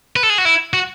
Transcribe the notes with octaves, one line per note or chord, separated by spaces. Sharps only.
B4
A4
G#4
F#4
E4
F#4